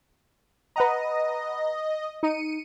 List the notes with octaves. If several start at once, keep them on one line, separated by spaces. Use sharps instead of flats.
B4 D#5 F#5 A#5
D#4 C#7 D#7